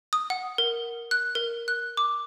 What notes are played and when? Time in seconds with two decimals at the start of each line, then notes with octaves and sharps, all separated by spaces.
0.13 D#6
0.30 F#5
0.58 A#4
1.11 F#6
1.35 A#4
1.68 F#6
1.97 D6